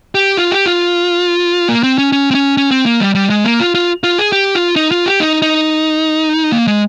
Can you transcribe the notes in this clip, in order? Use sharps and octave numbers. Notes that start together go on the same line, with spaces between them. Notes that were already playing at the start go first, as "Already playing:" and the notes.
G4
F4
G4
F4
A#3
C4
C#4
C#4
C4
C#4
C#4
C4
A#3
G3
G3
G#3
A#3
F4
F4
F4
G#4
G4
F4
D#4
F4
G4
D#4
D#4
A#3
G#3